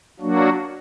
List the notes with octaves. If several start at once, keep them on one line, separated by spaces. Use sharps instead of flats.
F#3 A#3 D4 F#4